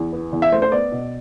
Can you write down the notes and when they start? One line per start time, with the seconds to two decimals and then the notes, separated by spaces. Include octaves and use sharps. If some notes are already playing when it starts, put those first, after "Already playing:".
Already playing: E2
0.13 B3
0.32 E2
0.42 E5
0.52 A3 C5
0.62 C5
0.72 B3 D5
0.92 B2